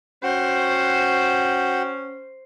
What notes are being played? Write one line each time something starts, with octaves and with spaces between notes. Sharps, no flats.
C#4 F#4 C5 F#5 G5